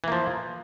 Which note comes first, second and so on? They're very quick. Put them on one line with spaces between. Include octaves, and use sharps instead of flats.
E3 A#3 F3